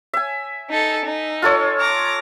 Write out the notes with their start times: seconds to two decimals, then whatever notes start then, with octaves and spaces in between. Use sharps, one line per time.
0.13 E5 G#5
0.70 D#4 A4
1.05 D#4
1.42 F4 A4 C#5
1.80 A#5 D6